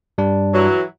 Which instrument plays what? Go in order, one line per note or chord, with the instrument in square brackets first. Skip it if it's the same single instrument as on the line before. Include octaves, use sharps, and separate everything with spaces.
[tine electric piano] G2 G3 D4
[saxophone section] E3 F#3